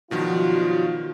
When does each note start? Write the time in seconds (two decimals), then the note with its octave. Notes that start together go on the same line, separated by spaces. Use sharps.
0.11 G2 B2 D#3 F3 F#3 F4 F#4